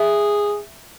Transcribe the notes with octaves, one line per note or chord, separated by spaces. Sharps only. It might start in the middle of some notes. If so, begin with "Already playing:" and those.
Already playing: G#4 E5